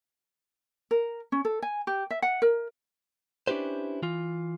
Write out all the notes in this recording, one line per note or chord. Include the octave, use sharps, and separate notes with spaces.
A#4
C#4
A4
G#5
G4
E5
F#5
A#4
C#4 D4 E4 G4 B4 C5
E3 F4